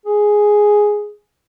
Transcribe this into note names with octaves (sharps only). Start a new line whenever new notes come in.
G#4